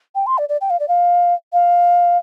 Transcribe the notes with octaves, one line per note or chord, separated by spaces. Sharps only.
G5
C6
D5
D5
G5
F5
D5
F5
F5